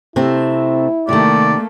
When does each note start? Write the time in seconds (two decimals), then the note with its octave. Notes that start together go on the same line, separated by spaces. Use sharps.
0.16 C3 A3 C4 E4
1.09 C3 D#3 A3 A#3 D5